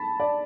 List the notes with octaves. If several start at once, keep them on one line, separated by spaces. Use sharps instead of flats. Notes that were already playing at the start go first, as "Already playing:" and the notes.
Already playing: A5 B5
D5